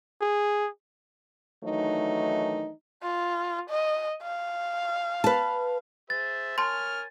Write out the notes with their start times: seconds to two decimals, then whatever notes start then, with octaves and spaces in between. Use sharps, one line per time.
0.21 G#4
1.64 D#3 E3 F#3 A3 D4 D#4
3.03 F4
3.70 D#5
4.22 F5
5.24 B4 A5
6.10 G#4 C5 E5 A6
6.58 A#4 C#5 G#5 A5 C6 F6